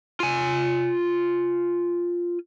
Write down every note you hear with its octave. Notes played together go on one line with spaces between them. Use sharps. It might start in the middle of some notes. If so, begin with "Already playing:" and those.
F4 G#5